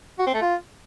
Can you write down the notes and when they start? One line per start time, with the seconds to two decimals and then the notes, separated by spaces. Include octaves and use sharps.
0.19 F#4
0.27 C4
0.34 A3
0.42 F4